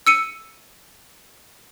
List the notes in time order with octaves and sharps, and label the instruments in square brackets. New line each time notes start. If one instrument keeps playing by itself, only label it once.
[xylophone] E6 C#7 D#7